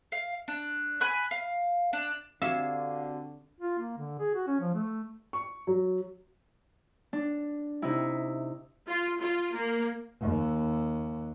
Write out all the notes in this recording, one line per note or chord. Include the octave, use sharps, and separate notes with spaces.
F5
D4
G#5 B5 F#6
F5
D4
D3 C4 F#4 G4 E5 F5
F4
A#3
D3
G#4
F#4
C#4
F3
A3
C#6
F#3
D4
C3 D#4 E4
F4
F4
A#3
D#2